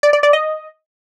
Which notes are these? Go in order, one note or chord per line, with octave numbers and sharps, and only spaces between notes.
D5
D5
D5
D#5